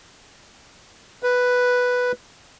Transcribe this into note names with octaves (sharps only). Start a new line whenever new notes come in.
B4